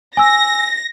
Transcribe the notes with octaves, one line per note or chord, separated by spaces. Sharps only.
G#5 E6 A#6